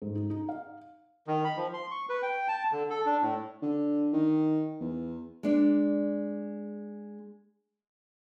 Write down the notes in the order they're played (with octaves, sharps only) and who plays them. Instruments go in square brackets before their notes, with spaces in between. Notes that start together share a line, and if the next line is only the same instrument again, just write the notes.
[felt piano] G#2
D#4
D#4
F5
[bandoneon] D#3
B5
F3
C6
C#6
B4
G5
A5
D3
A4
D4
A2
[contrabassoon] D3
D#3
E2
[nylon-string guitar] G#3 D4 D5